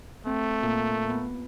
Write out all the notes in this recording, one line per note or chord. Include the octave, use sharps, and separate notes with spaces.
A3 C4
A#2
B3